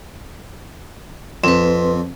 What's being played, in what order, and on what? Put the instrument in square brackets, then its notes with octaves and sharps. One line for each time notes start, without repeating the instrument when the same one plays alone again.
[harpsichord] F2 [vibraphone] C4 B4